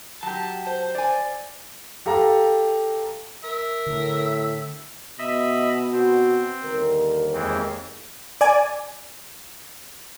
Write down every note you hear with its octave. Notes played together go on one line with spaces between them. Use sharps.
F#3 G4 A5
C5
D5 G#5
G4 A4 F5 A#5
A#4 E5
A2 D3
B2 D#5 E5 B5
C4 F#4
D#2 D3 G3 A#4
F2 E3 G#3 A#3 C4 G#4
D5 G#5